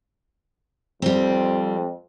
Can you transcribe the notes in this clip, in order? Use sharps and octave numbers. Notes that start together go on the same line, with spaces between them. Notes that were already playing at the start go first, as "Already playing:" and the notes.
F2 G3 C4